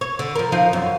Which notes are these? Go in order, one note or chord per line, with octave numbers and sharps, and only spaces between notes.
C#5
D3
F3 A#4
F3 D#4 F5
F#2